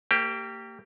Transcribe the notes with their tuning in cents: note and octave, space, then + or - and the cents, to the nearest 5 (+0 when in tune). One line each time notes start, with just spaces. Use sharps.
A#3 -35 G4 +0 C5 +0